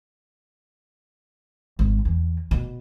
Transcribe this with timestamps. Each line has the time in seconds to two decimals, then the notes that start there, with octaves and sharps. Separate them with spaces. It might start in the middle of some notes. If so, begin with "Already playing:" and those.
1.79 G#1
2.05 E2
2.51 B2